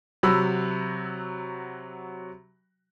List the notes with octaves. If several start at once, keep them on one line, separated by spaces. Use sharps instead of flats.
C3 F#3 F#4 B5 E6